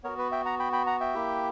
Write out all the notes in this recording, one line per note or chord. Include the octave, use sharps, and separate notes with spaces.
B3 F#4 A#4 C#5
B4
E5 G5
F#5 A#5
G5 B5
G5 B5
F#5 A#5
E5 G5
A#3 E4 G4